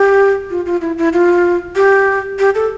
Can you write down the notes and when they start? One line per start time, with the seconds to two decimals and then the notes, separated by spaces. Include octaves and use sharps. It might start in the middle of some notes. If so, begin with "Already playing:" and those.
Already playing: G4
0.50 F4
0.66 F4
0.81 E4
0.98 E4
1.13 F4
1.76 G4
2.39 G4
2.55 A4